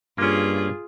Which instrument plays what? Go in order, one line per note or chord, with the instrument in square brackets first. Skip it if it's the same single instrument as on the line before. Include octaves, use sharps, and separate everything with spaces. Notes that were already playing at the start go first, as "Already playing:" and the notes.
[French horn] G2 [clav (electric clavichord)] A#3 C#4 [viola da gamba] F4 G#4